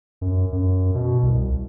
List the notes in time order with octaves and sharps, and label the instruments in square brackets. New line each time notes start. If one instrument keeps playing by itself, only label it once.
[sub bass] F#2
F#2
B2
C2